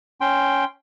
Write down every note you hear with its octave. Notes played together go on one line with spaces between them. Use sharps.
C#4 G5 C6